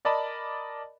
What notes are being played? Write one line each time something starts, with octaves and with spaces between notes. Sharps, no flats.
A#4 D5 D#5 A5 B5